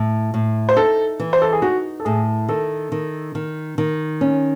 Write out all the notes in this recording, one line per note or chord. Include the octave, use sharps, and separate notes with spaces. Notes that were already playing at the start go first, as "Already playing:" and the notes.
Already playing: A2
A2
C5
D#4 A4
E3
C5
A4
G#4
D#4 F#4
A4
A2 G#4
D#3 A4
D#3
D#3
D#3
C#4